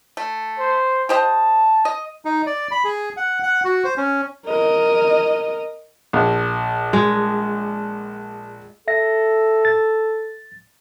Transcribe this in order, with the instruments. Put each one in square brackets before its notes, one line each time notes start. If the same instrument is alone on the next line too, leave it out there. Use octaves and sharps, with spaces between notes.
[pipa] A3
[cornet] C5
[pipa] G4 C5 D#5 [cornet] A5
[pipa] D#5
[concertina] D#4
D5
B5
G#4
F#5
F#5
F#4
C5
C#4
[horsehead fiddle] A#4 D#5
[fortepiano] A#1
[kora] G#3
[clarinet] A4 [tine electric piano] E5 A#6
[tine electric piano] A6